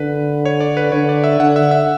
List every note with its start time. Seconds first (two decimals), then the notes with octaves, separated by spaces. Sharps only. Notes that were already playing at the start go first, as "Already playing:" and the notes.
Already playing: D3 B4
0.45 C#5
0.60 D5
0.77 B4
0.92 D3 C#5
1.09 D5
1.24 E5
1.40 D3 F#5
1.56 E5
1.71 E5